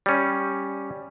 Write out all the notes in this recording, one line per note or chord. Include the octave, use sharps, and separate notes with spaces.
G3 C#4